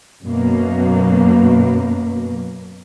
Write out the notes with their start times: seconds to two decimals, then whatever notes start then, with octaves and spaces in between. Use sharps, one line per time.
0.24 F#2 B2 A#3